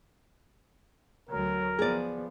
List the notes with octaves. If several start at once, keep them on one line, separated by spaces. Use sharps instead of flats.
D2 F#3 A#4
F3 B3 G#4 D5